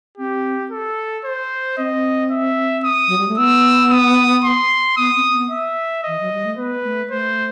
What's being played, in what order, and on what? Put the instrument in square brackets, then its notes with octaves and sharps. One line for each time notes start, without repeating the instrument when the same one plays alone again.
[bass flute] C4 [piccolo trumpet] G4
[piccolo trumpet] A4
C5
[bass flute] C4 [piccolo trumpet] D#5
[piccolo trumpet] E5
D#6
[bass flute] F#3
G3
A3
[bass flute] B3 [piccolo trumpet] E6
[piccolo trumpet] D#6
C6
[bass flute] B3 [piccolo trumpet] D#6
[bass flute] C4
B3
[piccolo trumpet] E5
[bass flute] E3 [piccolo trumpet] D#5
[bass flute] F#3
G3
A3
[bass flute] B3 [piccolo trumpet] B4
[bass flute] A3
[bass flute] A3 [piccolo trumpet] C5